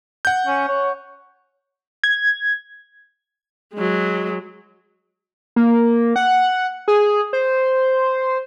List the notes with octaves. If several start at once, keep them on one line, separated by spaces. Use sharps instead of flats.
F#5 G6
C#4
C#5
G#6
F#3 G#3
A#3
F#5
G#4
C5